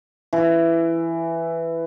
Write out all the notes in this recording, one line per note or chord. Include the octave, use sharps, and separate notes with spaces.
E3